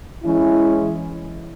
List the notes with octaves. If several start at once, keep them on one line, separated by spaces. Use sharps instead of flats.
E3 G#3 C#4 E4